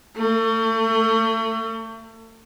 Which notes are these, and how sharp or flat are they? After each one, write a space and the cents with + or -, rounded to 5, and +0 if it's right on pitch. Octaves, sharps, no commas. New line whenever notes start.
A3 +35